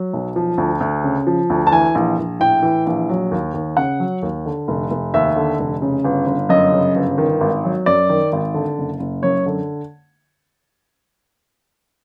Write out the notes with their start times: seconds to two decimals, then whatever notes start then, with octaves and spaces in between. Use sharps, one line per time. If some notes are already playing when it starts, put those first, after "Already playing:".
Already playing: F#3
0.13 B1
0.36 F3
0.58 D2
0.80 D2
1.04 C#3
1.27 F3
1.50 D2
1.67 A5
1.71 E3 G#5
1.95 A#1
2.18 A#1
2.40 A2 G5
2.62 E3
2.86 A#1
3.09 F#3
3.31 D#2
3.54 D#2
3.77 C#3 F#5
4.00 F#3
4.22 D#2
4.46 D3
4.68 F1
4.91 F1
5.14 D#2 E5
5.36 D3
5.59 F1
5.82 C#3
6.04 G1
6.27 G1
6.49 F#2 D#5
6.72 C#3
6.95 G1
7.18 D#3
7.41 G#1
7.64 F#3
7.86 F#2 D5
8.09 D#3
8.33 G#1
8.54 D3
8.78 F#1
9.00 F#1
9.23 F#2 C#5
9.46 D3